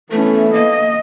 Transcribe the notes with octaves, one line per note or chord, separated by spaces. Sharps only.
E3 A3 B3 C#4 E4 A4
A#3 D#5